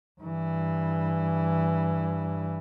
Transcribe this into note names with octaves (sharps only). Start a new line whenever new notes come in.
G2 E3